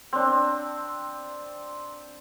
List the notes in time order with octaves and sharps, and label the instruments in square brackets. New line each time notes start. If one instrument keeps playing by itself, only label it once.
[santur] C4 D4